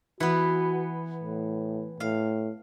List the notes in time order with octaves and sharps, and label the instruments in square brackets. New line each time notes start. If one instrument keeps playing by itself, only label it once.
[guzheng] E3 B3 [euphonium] F#4
[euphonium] A2
[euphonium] A2 [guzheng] F5